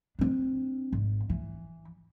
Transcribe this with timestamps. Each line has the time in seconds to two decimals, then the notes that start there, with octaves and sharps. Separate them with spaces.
0.19 C4 D4
0.93 G#1
1.30 E3